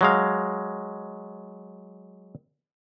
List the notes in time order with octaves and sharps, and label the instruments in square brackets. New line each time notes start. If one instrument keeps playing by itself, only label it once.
[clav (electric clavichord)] F#3 G#3 F5